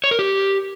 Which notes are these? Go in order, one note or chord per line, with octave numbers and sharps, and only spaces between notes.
C#5
A#4
G4